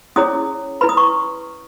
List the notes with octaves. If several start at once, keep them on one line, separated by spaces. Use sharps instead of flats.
C#4 E4 G#4 C#5 D#6
E4 B4 B5
D#6
C#6